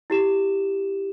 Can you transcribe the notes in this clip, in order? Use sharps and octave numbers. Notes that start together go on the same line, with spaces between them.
E4 G4 E7